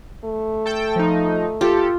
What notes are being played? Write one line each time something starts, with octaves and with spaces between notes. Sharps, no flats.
A3
A4 G5
F3 D#4
F4 G4 A4